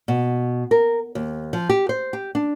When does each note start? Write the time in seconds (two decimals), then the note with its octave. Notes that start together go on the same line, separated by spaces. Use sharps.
0.08 B2
0.71 A#4
1.15 D#2
1.53 F3
1.69 G4
1.89 C5
2.13 G4
2.35 D4